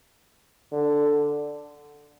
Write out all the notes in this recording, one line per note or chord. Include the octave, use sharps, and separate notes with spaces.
D3